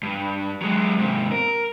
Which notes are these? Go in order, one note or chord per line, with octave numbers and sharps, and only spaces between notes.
G2
F#3 G#3
G#2 C3
A#4